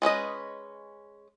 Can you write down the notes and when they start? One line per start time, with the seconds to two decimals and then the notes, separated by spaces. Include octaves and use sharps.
0.02 G#3 C#4 B4 D#5